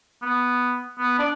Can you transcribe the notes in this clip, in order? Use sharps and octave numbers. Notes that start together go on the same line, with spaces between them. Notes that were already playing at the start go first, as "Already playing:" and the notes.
B3
B3
D4